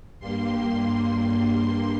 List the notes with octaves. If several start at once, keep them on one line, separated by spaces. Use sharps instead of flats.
G2 G3 A#3 C6